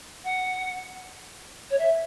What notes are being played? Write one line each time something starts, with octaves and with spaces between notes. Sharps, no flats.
F#5
C#5
E5